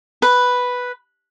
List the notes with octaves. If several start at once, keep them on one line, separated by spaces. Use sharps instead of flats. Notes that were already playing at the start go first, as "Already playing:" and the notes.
B4